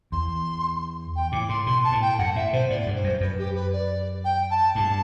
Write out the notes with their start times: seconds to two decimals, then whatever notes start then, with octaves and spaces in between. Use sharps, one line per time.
0.12 E2 C6
1.15 G5
1.32 A2 D6
1.49 A2 C6
1.66 B2 C6
1.84 A5
1.92 A2
2.01 G5
2.18 F#2 F#5
2.35 A2 E5
2.52 B2 C5
2.69 A2 D5
2.86 G2
2.95 C5
3.04 F#2
3.21 F#2 B4
3.38 G4
3.55 B4
3.72 D5
4.24 G5
4.50 A5
4.75 G2 A5